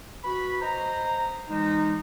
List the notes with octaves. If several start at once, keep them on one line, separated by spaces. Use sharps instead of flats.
F#4 B4 B5
C5 D#5 A#5
E3 G#3 D#4